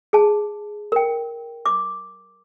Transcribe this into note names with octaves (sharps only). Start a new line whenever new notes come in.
G#4 A5
A#4 G5
D6